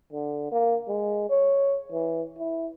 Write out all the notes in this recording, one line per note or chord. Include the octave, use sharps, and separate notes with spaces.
D3
A#3
G#3
C#5
E3
E4